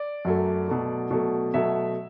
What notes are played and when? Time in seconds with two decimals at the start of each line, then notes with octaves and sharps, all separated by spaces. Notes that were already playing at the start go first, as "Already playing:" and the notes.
Already playing: D5
0.25 F#2 F#3 A3
0.68 B2 F#3 A3
1.11 B2 F#3 A3
1.54 B2 F#3 A3 E5